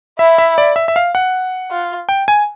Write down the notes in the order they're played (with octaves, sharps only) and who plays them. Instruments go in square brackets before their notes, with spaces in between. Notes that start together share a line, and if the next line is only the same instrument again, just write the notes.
[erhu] E4 [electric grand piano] E5
[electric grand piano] E5
D5
E5
E5
F5
F#5
[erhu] F4
[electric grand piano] G5
G#5